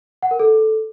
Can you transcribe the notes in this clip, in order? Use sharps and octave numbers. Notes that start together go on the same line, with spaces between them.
F#5
A#4
A4